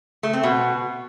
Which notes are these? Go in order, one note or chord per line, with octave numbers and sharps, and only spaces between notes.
A3
C4
B2